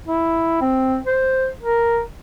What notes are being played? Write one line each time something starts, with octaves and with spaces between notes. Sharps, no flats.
E4
C4
C5
A#4